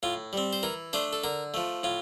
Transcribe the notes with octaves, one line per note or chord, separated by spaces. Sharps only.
A2 F4
G3 C4
C5
E3 A#4
A3 D4 C5
A4
D3 A#4
F3 A3
A2 F4